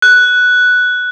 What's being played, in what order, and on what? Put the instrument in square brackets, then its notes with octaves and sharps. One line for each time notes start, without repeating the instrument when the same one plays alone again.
[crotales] F#6